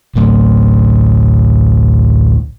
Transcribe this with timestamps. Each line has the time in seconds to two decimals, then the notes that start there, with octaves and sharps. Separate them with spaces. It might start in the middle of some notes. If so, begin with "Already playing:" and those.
0.16 A1 D2 A2